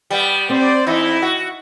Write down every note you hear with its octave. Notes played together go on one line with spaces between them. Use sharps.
G3 B3
C4 C5 D5
E2 D#4 E4
F#4